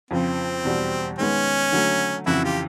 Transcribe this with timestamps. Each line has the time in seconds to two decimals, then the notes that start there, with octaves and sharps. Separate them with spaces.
0.11 F2 C#3 F3 C4
0.65 E2 B2 G3
1.18 D#3 G#3 B3 C#4
1.72 D3 F#3 A3
2.26 F2 C#3 E3 E4 F#4
2.44 F4 G4